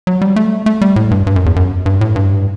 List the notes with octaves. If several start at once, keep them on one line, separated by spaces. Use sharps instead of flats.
F#3
G3
A3
A3
G3
A2
G2
G2
F#2
E2
F#2
G2
A2
G2